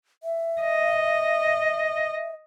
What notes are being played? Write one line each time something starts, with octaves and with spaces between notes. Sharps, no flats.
E5
D#5